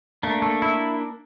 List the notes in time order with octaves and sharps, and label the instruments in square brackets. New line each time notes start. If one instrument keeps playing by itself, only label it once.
[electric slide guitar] A3 [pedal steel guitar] A#3 D4
[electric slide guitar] A3
E4